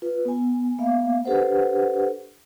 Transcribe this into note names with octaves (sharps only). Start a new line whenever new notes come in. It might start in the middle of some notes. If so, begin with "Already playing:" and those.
F4 B4
B3 G#5
A#3 B3 E5 F5
D4 G4 A4 B4 C5 F#5